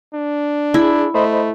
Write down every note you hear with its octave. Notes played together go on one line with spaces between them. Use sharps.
D4
E4 G#4
A3 C5 D#5 B5